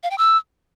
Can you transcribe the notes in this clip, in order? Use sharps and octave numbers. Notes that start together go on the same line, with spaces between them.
F5
G5
E6